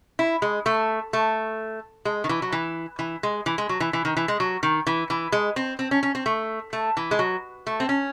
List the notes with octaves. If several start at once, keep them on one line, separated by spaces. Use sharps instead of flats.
E4
G#3
A3
A3
G#3
D#3
E3
F#3
E3
E3
G#3
E3
G#3
F#3
E3
E3
D#3
E3
G#3
F#3
D#3
E3
E3
G#3
C4
C4
C#4
C#4
C4
A3
A3
E3
G#3
F#3
A3
C4
C#4